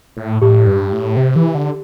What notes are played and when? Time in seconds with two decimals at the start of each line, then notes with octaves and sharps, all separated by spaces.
0.17 A2
0.42 A2 G4
0.67 G2
0.93 A2
1.17 C3
1.36 E3
1.55 D3